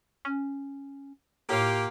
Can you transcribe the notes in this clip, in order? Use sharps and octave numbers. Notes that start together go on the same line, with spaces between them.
C#4
A2 A#3 F4 G4